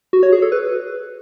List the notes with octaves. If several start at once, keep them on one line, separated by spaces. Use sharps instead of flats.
F#4
C#5
G#4
A4
B4